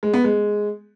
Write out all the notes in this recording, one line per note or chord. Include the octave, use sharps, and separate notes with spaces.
G#3
B3
G#3